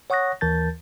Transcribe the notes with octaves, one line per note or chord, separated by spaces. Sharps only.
C#5 F#5 C#6 D#6 F#6 A#6
D#2 E3 A#4 A5 G6 A6